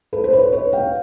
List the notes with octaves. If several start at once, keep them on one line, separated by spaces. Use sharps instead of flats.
A4 B4
C5
B4 C#5
B4 C#5
F5 G5